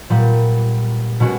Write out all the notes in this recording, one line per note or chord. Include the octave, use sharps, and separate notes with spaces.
A#2 G3 B3
B2 G#3 C#4 F#4